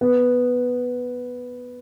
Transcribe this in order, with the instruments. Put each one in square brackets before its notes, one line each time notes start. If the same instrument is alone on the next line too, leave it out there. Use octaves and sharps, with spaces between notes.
[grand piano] B3